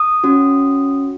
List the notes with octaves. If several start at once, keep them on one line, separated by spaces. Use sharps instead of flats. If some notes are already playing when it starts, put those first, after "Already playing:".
Already playing: D#6
C#4 F#4